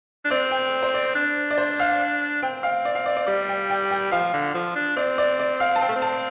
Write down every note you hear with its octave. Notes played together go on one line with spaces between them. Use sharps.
D4
C4 D5
G5
C5
D5
D4
D5
C5
F5
C4 G5
F5
D5
F5
D5
D5
G3 D5
G5
G5
G5
F3 F5
D3
F3
D4
C4 D5
D5
D5
F5
A5
C4 G5
A3
C4
A5